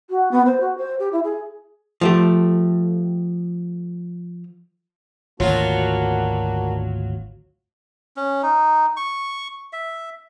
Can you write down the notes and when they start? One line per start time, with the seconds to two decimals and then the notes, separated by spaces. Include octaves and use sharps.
0.10 F#4
0.31 B3
0.46 C5
0.61 F#4
0.78 C5
0.99 G4
1.13 E4
1.24 G#4
2.01 F3 A3 G4
5.40 G#1 D2 B2 F#3 A#3 D4 F4 F#4
8.17 C#4
8.43 D#4
8.97 C#6
9.73 E5